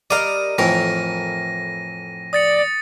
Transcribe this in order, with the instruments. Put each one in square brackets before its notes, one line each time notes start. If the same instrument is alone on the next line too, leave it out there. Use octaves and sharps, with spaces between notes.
[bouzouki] G3 A#4 D#5 [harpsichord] D5 F5 [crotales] D#7
[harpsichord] F2 A2 E3 [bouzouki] A#4 [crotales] A#6
[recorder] D5 [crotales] D#6 A6 C#7